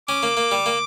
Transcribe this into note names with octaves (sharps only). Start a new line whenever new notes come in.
C#4 D6
A#3
A#3
G3
A#3